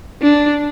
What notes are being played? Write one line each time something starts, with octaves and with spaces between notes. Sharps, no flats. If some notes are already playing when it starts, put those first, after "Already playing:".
D4